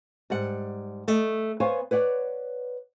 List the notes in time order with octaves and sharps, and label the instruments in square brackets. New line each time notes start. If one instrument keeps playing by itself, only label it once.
[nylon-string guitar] G#2 G3 F#5
A3 D#5
B3 C5 C#5 F5 G#5
B4 C#5 D5 F#5